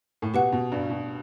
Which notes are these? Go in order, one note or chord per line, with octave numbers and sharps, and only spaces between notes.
A2
B2 G4 B4 F#5
B2
G2
B2